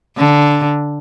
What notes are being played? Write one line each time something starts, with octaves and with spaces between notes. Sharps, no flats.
D3